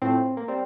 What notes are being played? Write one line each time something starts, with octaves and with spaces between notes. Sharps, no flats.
A2 F3 A3 C4
A#3
G3 C4